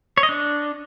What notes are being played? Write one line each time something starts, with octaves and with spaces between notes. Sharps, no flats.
C#5
D#5
D4